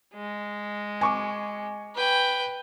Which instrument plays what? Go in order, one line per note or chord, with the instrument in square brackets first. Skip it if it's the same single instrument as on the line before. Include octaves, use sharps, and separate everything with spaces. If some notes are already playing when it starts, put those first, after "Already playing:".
[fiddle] G#3
[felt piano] G#5 C#6 D6
[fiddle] B4 G5